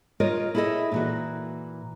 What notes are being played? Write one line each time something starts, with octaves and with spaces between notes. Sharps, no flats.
F4 A#4 C#5 D#5
E4 G#4 A4 C5 D#5 E5
A#2 E3 F#4